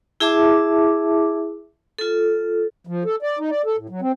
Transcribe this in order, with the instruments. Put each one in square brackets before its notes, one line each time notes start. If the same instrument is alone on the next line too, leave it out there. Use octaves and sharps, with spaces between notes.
[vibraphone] E4 G#4 E5 A5 D6
F4 A4
[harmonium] F3
A4
D5
D#4
D5
A4
A2
F#3
C4